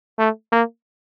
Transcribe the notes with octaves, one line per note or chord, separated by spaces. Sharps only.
A3
A#3